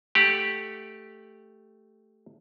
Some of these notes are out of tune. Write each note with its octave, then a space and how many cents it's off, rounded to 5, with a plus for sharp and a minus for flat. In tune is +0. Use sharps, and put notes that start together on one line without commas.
A3 +0 G4 +0 F#5 +0